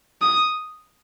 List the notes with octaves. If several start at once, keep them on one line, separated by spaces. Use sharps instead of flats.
D#6